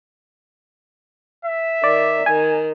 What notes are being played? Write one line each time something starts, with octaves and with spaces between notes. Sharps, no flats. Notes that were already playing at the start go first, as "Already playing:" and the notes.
E5
D#3 D5
D#3 G#5